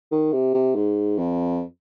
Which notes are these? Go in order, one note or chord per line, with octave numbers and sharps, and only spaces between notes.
D#3
C3
C3
G#2
F2